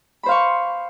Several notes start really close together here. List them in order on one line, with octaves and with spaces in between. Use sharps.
B5 C5 F5 C#6